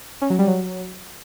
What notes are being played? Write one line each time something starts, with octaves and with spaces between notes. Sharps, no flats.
C#4
F#3
G3
F#3